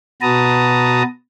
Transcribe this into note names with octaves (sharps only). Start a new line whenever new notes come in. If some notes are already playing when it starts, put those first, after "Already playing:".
B2 F#4 B4 A5 A#5 D#6